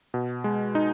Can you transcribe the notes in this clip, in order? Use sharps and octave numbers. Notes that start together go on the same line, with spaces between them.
B2
G#3
D#4